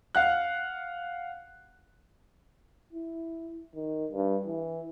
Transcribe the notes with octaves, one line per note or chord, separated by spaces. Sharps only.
F5 F#5 F#6
E4
D#3
G2
E3